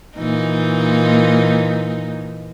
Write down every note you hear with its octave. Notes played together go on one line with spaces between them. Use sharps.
A#2 E3 D#4